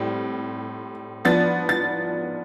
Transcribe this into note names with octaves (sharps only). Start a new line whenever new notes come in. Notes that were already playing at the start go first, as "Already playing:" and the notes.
Already playing: A2 G3 C4
F3 B3 D4 A6
A6